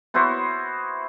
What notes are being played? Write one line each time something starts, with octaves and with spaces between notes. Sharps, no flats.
B3 E4 F#4 C5